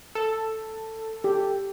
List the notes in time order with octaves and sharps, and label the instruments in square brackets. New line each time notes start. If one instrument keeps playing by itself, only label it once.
[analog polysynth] A4
[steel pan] G4